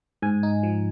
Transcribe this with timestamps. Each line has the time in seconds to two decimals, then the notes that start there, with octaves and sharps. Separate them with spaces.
0.22 G#2 G#5
0.43 D#4
0.63 F3